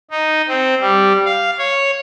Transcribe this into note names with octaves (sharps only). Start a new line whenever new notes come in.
D#4
C4
G3
F5
C#5